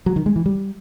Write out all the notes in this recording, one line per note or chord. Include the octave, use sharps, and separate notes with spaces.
F#3
D#3
G#3
E3
G3